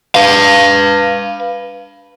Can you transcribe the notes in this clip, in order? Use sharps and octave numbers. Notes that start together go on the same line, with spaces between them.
B4 F5